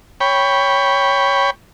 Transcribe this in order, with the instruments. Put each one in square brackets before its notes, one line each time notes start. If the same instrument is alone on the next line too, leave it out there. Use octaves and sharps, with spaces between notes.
[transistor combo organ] C#5 G5 B5